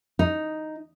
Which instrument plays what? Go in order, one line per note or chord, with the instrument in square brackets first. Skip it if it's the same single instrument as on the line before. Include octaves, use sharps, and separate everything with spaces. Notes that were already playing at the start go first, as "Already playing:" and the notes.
[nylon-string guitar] D#4